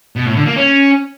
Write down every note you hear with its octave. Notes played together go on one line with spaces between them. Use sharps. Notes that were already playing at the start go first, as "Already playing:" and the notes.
B2
A2
D3
A#3
C#4